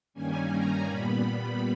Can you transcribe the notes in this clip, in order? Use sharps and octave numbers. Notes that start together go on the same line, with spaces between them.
G2 D#3 G3 A#3 C#4 G#5
A#5
A#2 G3 B3 B5